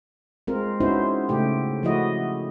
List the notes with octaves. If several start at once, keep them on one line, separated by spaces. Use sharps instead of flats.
G#3 C4 F4 A#4
B3 C#4 D#4 E4 F#4 C5
C#3 A3 G4
F3 A3 E4 F#4 D#5